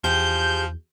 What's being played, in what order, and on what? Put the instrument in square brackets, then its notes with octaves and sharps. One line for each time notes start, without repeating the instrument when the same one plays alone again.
[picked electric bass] E2 [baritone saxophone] F3 [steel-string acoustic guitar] G4 G#4 [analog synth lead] G6